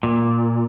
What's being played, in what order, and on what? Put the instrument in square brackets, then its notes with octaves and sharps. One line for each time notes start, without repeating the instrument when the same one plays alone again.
[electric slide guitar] A#2